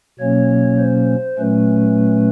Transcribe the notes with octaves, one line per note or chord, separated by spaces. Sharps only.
B2 F#3 A#3 C#4 C#5
C5
A#2 F#3 A3 C#4 B4